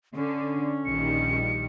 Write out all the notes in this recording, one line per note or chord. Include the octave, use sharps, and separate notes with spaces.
D3 C#4
A#1 D#3 G3 C#7